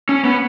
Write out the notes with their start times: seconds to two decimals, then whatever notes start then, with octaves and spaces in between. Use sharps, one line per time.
0.09 C#4
0.25 B3